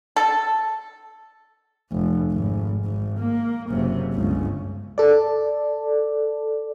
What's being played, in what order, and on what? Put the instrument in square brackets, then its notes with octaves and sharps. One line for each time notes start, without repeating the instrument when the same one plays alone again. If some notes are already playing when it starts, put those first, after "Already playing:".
[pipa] A4
[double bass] F1
G#1
G#1
A#3
F#1 C3
G1 C#2
[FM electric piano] A4 D5